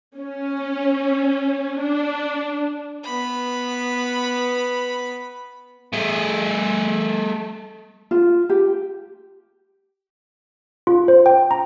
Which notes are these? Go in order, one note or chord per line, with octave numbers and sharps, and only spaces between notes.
C#4
D4
B3 B5
A3 G#4
F4
G4
F4
C5
G5
A#5